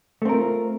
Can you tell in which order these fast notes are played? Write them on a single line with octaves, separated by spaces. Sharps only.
A3 C4 A#4 F4